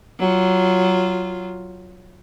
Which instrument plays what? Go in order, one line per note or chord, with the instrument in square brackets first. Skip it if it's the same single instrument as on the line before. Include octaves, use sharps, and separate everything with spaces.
[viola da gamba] F#3 F4